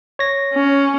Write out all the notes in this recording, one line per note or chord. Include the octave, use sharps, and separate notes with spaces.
C#5 A#6
C#4